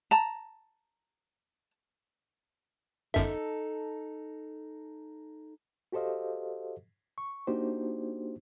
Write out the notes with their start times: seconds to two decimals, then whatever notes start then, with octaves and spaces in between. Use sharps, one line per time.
0.11 A5 A#5
3.14 G1 F#2 D#4 A4 E5
5.92 F#4 G4 A4 C5 D#5 F5
7.18 C#6
7.47 A#3 D4 D#4 F#4 G4 C5